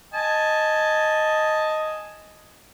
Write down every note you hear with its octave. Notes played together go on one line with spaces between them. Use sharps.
D#5 G#5 A5